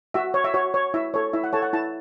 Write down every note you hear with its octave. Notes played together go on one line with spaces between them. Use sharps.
F#4 E5
C#5
E5
F#4 C#5
C#5
E4 E5
A4 C#5
E4 E5
F#5
A4 C#5 A5
F#5
E4 A5